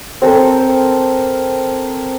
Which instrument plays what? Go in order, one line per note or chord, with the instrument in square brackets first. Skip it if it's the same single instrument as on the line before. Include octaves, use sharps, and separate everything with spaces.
[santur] C4 A4 A#4 C5